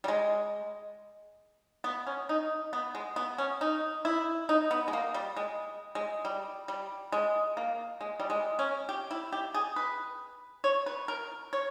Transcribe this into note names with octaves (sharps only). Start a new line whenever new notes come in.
G3
G#3
B3
C#4
D#4
B3
G#3
B3
C#4
D#4
E4
D#4
B3
G#3
A#3
G3
G#3
G#3
G3
G3
G#3
A#3
G#3
G3
G#3
C#4
G4
E4
G4
G#4
B4
C#5
B4
A#4
C#5